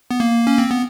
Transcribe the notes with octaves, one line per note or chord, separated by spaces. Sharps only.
B3
A#3
C#4
C4
B3